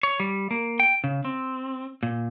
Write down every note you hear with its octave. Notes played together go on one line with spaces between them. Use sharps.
C#5
G3
A#3
G5
C#3
C4
A#2